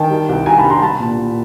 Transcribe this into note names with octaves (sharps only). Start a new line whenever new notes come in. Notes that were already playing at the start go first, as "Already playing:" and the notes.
Already playing: D#3 G5 A5
G3
C2
C2 G#5 A#5
A5 B5
G3
A#5 C6
G3 A5 B5
A#2
A#2